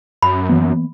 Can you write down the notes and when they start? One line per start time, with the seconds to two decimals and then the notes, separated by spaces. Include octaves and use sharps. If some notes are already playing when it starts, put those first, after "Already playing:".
0.22 F#2 B5
0.49 E3 A#3 B3